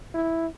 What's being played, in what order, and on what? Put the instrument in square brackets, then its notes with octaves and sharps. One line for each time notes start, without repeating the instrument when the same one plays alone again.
[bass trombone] E4